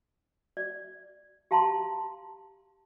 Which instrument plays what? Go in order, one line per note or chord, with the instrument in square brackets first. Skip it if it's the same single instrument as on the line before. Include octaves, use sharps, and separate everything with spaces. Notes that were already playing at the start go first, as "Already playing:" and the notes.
[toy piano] D5
G4 F5 A5 A#5 C6